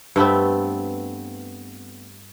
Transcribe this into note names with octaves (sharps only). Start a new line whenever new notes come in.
G2 A3 B3 C4